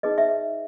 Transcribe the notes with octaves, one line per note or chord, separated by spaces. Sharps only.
D#4 G#4 B4 D#5
E5